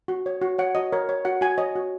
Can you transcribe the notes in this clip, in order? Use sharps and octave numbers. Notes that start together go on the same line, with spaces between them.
F#4
C#5
F#4
C#5 F#5
F#4 D#5
A#4 C#5
C#5
F#4 F#5
F#4 G#5
C#5 D#5
F#4